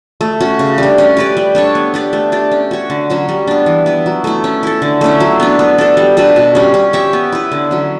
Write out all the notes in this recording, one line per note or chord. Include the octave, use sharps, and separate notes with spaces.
A3
C#4 F#4
C#3
G3 D4
C#4
G4 B4 D5
G3
D4 A4 C#5
B3
D4 G4 D5
A3
D4 G4 D5
C#4
F#4 C#5
D3
F#3 C#4 F#4
G3
B3 D4
E3
B3 E4
F#3
A3 E4
C#4
E4 A4
D3
A3 C#4 E4
F#3
B3 D4
B3
D4 A4
G3
D4 F#4 B4
B2
G3 C#4
C#4
G4 C#5 E5
B3
E4 B4
D3
F#3 C#4